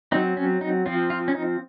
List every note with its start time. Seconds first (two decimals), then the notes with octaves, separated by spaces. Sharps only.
0.12 F#3 C4 D#4
0.37 C#4
0.61 D#4
0.86 F3 C4 F4
1.10 F4
1.28 C#4
1.35 D#4